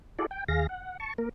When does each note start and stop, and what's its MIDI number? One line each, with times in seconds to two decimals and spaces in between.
0.19 0.26 64
0.19 0.26 66
0.19 0.26 68
0.19 0.26 69
0.19 0.26 74
0.31 0.44 79
0.48 0.67 39
0.48 0.67 68
0.48 0.67 77
0.48 0.67 94
0.69 0.97 78
1.00 1.13 81
1.00 1.13 85
1.18 1.29 58
1.18 1.29 70